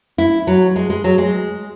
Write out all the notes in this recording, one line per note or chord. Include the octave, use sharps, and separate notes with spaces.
E4
F#3
G#3
G#3
F#3
G#3